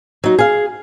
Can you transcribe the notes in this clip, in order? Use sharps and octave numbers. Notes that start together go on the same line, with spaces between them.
F#3 D#4
G#4 F5